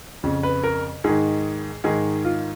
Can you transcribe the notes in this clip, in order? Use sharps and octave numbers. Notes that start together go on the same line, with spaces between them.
F2 C#3
B4
A#4
G#2 D#3 G#4
G#2 D#3 G#4
F4